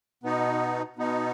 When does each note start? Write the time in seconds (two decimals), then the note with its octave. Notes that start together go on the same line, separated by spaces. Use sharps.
0.23 B2 B3 D#4
0.96 B2 B3 D#4